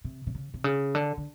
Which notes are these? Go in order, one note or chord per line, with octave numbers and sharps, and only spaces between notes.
C3
C3
C#3
C3
C#3
D3
D3